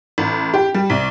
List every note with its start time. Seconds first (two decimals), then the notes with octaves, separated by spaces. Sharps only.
0.18 A1
0.54 G4
0.74 G3
0.90 C2